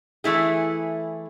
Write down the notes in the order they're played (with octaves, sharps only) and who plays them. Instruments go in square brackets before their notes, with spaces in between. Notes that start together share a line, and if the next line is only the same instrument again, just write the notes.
[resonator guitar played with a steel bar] E3 A3 E4 G#4